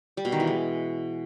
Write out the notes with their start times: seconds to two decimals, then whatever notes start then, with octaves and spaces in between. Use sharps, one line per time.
0.17 G3
0.25 B2
0.32 D#3
0.40 E3
0.47 G#3